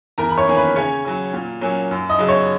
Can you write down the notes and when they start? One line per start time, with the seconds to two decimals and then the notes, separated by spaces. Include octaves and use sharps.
0.18 E2 A#4 A#5
0.29 B5
0.38 C#5 C#6
0.47 D#3 A#3 C#4
0.56 B4 B5
0.76 C#3 C#4 C#5
1.05 F#3 C#4
1.33 A#2
1.61 F#3 A#3 C#4
1.91 F#2
2.09 D#5 D#6
2.19 C#3 F#3
2.28 C#5 C#6